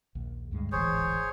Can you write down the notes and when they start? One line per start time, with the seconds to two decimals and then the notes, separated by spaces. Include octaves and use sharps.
0.15 A#1 D#2
0.51 D2 G2 G#3
0.72 D1 G#1 E3 G#4 C5 C#5